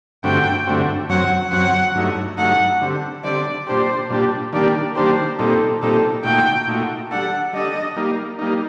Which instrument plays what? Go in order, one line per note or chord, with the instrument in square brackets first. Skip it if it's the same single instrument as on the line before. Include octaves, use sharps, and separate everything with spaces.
[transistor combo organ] G2 D3 A3 C4 F#4 [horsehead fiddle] G5
[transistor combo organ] G2 D3 A3 C4 F#4
[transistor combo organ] F#2 F#3 C4 [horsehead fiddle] F#5
[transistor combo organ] F#2 F#3 C4 [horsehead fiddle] F#5
[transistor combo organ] G2 F#3 A3 D#4
[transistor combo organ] G2 F#3 A3 D#4 [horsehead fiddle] F#5
[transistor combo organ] D3 G3 C4
[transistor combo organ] D3 G3 C4 [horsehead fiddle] D5
[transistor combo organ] A#2 G3 D4 G4 [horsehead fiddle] C5
[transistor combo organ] A#2 G3 D4 G4
[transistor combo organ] D#3 G3 A#3 D4 G4 [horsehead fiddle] D5
[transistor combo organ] D#3 G3 A#3 D4 G4 [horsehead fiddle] C5
[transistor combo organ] A#2 G3 C4 D#4 [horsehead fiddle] A4
[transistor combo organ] A#2 G3 C4 D#4 [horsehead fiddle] A4
[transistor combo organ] A#2 A3 D#4 F#4 [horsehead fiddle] G5
[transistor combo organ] A#2 A3 D#4 F#4
[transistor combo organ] G3 D4 A4 [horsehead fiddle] F#5
[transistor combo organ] G3 D4 A4 [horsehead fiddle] D#5
[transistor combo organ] G3 A#3 D#4
G3 A#3 D#4